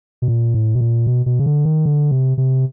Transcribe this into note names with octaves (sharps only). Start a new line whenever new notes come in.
B2
A#2
A2
B2
A#2
B2
B2
C#3
D3
D#3
D3
C3
C3